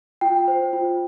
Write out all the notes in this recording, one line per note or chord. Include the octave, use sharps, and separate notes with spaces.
F4 G5
C5
F4